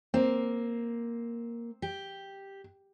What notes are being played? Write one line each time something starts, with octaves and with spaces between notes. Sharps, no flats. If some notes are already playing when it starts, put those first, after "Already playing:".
A#3 C4
G4